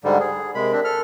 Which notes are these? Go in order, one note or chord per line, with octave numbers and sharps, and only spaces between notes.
G#2 D3 G3
G#4
C3 G#3 A#4 B5
C4 D4
A4 F6